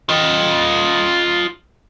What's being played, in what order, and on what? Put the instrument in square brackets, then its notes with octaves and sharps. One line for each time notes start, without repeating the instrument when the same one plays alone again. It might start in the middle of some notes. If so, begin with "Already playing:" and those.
[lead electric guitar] F4 D#5